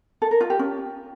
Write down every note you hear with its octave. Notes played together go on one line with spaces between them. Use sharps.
A4
A#4
F4
G4
C#4